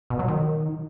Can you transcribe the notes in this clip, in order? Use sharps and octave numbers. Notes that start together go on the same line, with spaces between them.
B2
F#3
D#3